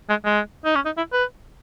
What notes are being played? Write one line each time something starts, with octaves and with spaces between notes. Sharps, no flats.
G#3
G#3
D#4
C#4
D#4
E4
B4